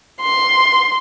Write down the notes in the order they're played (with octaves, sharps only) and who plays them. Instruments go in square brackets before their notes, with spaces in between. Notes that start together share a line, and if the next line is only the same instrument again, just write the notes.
[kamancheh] C6